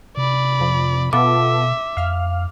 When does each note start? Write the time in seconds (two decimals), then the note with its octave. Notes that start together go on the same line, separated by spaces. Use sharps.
0.17 C3 D5 B5
0.60 F2 F3
1.13 B2 B3 F4 A4 E5 D6
1.97 F2 F5 F6